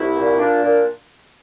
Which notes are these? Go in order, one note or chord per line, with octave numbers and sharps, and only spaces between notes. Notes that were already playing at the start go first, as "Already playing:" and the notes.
Already playing: C2 E4
A#2
A#2 D4
A#2